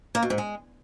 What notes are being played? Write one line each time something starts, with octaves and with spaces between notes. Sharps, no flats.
A#3
B2
G#2
G#3